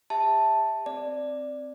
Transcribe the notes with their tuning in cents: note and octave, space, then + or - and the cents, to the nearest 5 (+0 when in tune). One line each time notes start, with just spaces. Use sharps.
G4 +35 E5 -15 A5 +0
C4 +0 D5 +0